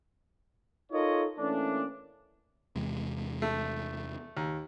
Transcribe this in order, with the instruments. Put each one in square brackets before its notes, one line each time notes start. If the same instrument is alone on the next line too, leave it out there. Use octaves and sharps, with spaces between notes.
[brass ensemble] D#4 F4 A4 A#4 C#5 D#5
E3 A3 A#3 C#4 D4
[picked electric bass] E2 C3 G#3
[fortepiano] A3
D#2